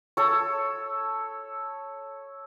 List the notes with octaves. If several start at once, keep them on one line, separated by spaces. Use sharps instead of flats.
A4 C#5